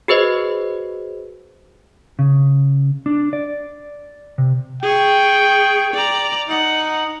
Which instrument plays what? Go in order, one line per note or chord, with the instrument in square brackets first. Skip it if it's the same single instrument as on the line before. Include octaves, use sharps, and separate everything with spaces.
[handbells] F#4 G#4 B4 C5 D#5
[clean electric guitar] C#3
D4
D5
C3
[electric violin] G#4 C#6 [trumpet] G5
[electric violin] D5 A#5
[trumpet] D#4 [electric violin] F#5